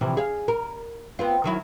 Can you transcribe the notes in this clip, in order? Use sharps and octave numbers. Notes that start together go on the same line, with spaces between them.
C3 E3 F3
G#4 F5
A#4
B3 C4 F4
D#3 F#3 E4